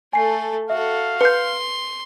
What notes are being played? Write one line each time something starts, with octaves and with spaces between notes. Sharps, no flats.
A3 A4 G#5 C7
F#4 A4 E5 F5
B4 C6 G6 C#7